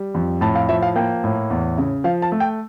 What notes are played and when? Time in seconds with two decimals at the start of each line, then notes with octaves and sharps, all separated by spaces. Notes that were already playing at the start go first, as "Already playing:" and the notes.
Already playing: G3
0.14 F2
0.41 A2 A5
0.55 F5
0.69 F3 E5
0.82 F5
0.96 A#3 G5
1.24 A2
1.50 E2
1.78 C#3
2.04 F3 F5
2.22 A5
2.32 A3
2.40 G5